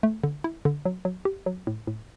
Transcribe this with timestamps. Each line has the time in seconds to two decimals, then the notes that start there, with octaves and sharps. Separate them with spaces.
0.03 A3
0.23 D3
0.44 E4
0.65 D3
0.85 F#3
1.05 F#3
1.25 G4
1.46 F#3
1.67 A2
1.87 A2